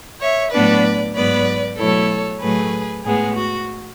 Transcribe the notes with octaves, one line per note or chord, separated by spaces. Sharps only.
C#5 E5
A2 F#3 B3 D4 B4 D5
G#2 F#3 B3 B4 D5
B2 F#3 A3 E4 A4 C#5
A2 F#3 A3 G#4 B4
A2 G#3 B3 G#4
F#4